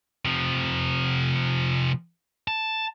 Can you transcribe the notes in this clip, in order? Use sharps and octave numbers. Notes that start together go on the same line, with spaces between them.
C3 F3
A5